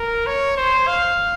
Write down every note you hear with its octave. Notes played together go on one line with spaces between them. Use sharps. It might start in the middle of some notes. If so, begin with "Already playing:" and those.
Already playing: A#4
C#5
C5
F5